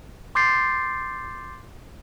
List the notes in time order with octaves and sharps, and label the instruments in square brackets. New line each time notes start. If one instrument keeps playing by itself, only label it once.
[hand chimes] C6 D6 G6 A6 C7